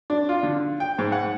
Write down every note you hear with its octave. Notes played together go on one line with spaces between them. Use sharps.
D4
F4
D3
G5
G#2
F#5